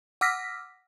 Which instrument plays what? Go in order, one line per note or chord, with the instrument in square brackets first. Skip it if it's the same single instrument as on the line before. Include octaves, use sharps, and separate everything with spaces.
[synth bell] F#5 D6 E6 F6 A#6 B6